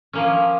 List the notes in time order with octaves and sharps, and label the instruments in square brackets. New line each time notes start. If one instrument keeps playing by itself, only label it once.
[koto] F3 A#3 C#4